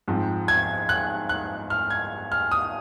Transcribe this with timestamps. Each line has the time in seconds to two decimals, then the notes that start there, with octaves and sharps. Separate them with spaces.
0.08 G#2 F3 C4
0.48 G#6
0.89 F#6
1.29 F#6
1.70 F6
1.90 G#6
2.32 F6
2.52 D#6